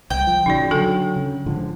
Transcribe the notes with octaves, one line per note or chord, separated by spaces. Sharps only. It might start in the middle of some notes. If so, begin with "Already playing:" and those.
C2 G5
F3
A#1 C#3 D#4 F#4 D5
D3 F#3 F#4 A4 G#5
C#3
G#2 D3 F3